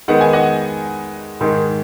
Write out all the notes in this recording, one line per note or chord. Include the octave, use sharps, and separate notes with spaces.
D#3 G#3 B3 D#4 F#5
G#5
D#5 F#5
G#2 D#3 G#3 D#4